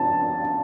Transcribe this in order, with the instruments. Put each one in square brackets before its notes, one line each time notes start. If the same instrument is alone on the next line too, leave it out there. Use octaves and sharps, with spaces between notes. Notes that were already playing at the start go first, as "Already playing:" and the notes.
Already playing: [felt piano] A5